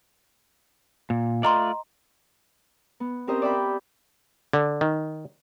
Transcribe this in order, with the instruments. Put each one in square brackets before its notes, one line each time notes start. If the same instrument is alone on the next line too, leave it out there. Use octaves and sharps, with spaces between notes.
[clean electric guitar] A#2
[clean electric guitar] A3 F4 D5 [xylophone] D#5 A#5 C6
[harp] B3
C4 C#4 G4 A#4 C5 D#5
D5 E5 G5 B5
[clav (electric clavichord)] D3
D#3